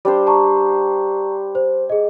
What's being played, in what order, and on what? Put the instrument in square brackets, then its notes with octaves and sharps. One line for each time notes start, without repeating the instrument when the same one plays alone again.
[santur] G3 D4 C5
[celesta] A5 A#5 C#6
C5
G#4 D#5